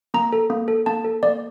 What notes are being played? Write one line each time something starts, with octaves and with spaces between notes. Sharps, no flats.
A#3 A#5
A4
A#3
A4
A#3 A5
A4
A#3 D5